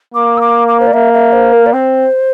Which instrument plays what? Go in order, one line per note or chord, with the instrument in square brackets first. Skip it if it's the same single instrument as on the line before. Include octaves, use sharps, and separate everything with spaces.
[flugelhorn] A#3 [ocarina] D6
[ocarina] E6
D6
D6
C5
D5
[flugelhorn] A#3 [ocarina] E5
[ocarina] E5
C5
A#4
D5
[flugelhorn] C4 [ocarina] C5